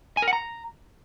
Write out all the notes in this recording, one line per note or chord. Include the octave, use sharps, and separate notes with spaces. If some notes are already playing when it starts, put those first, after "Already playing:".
G#5
A#4
F#5
A#5